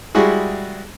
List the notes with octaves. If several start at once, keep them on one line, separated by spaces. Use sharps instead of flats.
G3 G#3 E4 F#4 G#4